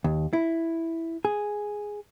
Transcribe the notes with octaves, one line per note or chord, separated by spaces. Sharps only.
D#2
E4
G#4